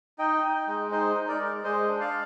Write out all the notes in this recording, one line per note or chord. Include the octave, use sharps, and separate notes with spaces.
D#4 D#5 G5
D#4
G#3
D#4 C5 D#5
D#4
A#4 D5
G#3
G#3 C5 D#5
D4
D5 F5